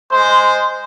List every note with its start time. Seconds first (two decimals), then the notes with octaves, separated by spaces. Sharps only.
0.11 G#3 C5